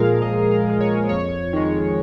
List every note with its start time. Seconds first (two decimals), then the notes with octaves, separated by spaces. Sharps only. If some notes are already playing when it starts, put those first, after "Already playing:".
Already playing: A#2 F3 G#3 G#4 A#4 F5
0.22 A#2 D#5
0.51 F5
0.66 F3 G#3
0.80 C#5
1.09 F2 C#5
1.53 D#3 G#3